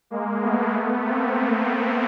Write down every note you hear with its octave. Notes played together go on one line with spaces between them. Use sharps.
G#3 A#3
A3 B3
A3 B3
A#3 C4